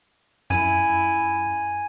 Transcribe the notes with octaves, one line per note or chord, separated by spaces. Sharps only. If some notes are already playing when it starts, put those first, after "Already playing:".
F#2 E4 G#5 G#6 D#7